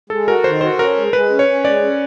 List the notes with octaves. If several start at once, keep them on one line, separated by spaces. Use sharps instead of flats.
G#3 A4
F#4 A#4
D#3 C5
F#4 C5
C#4 A#4
G#3
G#3 B4
C#4
C#5
C#4
G#3 D5
C#4